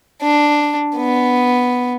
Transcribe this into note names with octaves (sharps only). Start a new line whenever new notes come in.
D4
B3